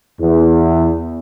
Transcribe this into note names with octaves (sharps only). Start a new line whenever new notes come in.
E2